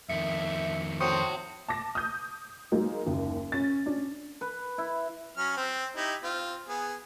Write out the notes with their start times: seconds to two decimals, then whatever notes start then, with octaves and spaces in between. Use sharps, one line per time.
0.09 F2 D#3 E5 C#7
1.00 A2 F#3 C4 C5 C#6 D#6 C#7
1.69 A5 D6 A#6
1.95 D#6 G6
2.72 F#3 G#3 A#3 D#4
3.06 F#1 D#2 C#3
3.52 C#4 A6
3.86 C#4 D4
4.41 B4
4.78 E4
5.37 F#3 C#4 F6
5.57 C4
5.96 D#4 E4 G4
6.23 C4 F4
6.69 B3 G#4